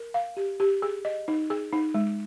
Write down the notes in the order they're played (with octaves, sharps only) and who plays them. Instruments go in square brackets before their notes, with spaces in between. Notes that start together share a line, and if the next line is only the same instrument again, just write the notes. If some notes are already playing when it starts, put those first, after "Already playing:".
Already playing: [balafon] A#4
F5
G4
G4
G#4
D#5
D#4
G#4
D#4
G#3